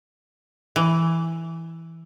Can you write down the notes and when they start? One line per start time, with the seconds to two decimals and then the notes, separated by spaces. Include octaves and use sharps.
0.76 E3